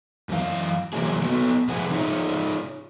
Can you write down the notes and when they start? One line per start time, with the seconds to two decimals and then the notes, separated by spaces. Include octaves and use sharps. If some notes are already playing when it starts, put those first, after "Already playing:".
0.29 F#2 E3 G4 F5
0.93 C3 E3 F#3 A#3 G#4
1.23 B3 F#4 A4 B4
1.68 C3 F3 G#4 B4 F#5 G#5
1.92 D#4 F4 G#4 C#5